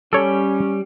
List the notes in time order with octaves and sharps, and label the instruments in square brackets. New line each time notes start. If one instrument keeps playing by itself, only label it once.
[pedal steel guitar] G3 [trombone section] C#4 [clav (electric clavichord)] A4 C#5